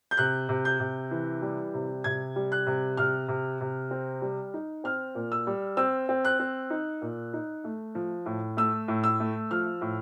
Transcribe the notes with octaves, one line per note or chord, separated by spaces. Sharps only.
G6
C3 F#6
C3
G6
C3
E3
G3
C3
C3 G#6
G3
F#6
C3
C3 F6
C3
C3
C4
G3
D#4
C4 F6
A#2
E6
G3
C4 E6
C4
F#6
C4
D#4
A#2
D#4
A3
F3
A2
A3 E6
A2
E6
A3
F3 F6
A2